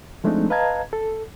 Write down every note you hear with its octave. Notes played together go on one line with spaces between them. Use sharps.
F3 G#3 A3 C4 D4 D#4
B4 D#5 F5 A5 A#5 G#6
A4